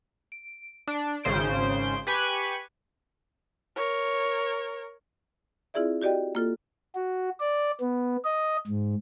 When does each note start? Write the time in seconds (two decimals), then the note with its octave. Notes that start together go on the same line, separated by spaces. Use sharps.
0.32 D7
0.87 D4
1.24 G#1 C#3 C5 G6 D7
2.07 G4 B4 G#5 B5 C#6
3.76 A#4 C#5
5.74 C4 E4 F4 G#4 D5 E5
6.01 F#4 G4 D5 D#5 G5
6.35 A#3 F4 A4
6.95 F#4
7.40 D5
7.80 B3
8.25 D#5
8.67 G#2